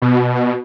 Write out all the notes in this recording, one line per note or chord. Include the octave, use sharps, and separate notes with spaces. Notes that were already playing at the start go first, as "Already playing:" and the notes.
B2